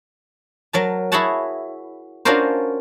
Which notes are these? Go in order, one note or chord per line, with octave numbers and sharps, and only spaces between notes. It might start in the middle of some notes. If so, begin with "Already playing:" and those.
F#3 A#4 A5
E4 F#4 G#4 C#5 F#5 A5
C#4 D4 F4 F#4 A#4 C5